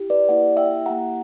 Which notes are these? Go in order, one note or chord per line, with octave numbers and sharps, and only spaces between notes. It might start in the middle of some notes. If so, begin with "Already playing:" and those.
Already playing: E4 G4
B4 D5
A#3 E4 G4 D5 F#5
E5 G5
A#3 E4 G4 F#5 A#5